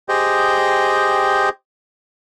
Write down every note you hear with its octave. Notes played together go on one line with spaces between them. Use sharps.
G4 G#4 C5 D#5 G5